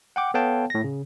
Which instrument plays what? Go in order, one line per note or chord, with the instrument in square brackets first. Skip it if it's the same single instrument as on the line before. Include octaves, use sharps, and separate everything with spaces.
[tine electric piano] F#5 G5 D6
B3 A4 C#5 F5 G5 A5
A2 A#6
C#3